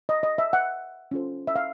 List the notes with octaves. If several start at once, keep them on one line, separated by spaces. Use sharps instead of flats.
D#5
D#5
E5
F#5
C#4 F4 A4 C5
E5
F5